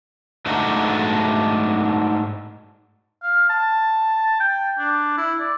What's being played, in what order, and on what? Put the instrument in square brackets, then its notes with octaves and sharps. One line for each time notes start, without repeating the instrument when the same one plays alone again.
[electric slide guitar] G#2 A3 D4 D#4 F#4
[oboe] F5
A5
G5
D4
E4
D5